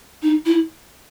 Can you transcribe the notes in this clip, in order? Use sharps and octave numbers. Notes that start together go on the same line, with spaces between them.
D#4
E4